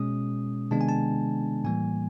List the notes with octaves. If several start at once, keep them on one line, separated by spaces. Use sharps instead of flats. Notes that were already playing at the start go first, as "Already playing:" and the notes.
Already playing: B2 G#3 C#4 D#6
C3 D#3 G#3 B3 D4 A5
G#5
A5
A2 E3 G3 A#3 G#5